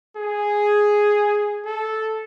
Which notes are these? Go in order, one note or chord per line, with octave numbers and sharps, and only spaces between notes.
G#4
A4